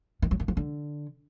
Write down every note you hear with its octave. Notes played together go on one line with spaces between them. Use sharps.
D#3
F#3
D#3
F3
D3